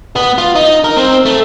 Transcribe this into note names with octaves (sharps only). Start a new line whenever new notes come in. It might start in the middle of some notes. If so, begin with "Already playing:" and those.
B3
F4
D#4
A#4
C4
A3